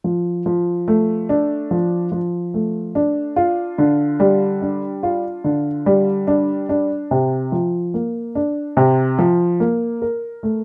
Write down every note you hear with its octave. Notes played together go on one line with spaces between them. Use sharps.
F3
F3
A3
D4
F3
F3
A3
D4
F4
D3
G3
D4
F4
D3
G3
D4
D4
C3
F3
A#3
D4
C3
F3
A#3
A#4
A3